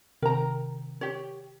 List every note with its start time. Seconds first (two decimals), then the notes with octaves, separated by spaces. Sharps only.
0.22 C3 D#3 A#4 G5 A#5
1.01 G4 C#5